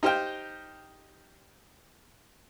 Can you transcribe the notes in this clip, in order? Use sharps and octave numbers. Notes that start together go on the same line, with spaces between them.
D#4 G4 C5 F5 G5